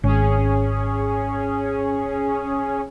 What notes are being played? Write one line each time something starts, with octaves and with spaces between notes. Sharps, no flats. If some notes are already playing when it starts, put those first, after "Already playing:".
G#1 C#4 G#4